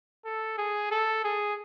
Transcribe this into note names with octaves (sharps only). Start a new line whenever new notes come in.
A4
G#4
A4
G#4